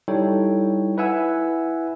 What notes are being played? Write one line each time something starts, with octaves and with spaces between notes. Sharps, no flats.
G3 D#4 E4 A4 C#5 G5
E4 B4 E5 F#5 G#5 E6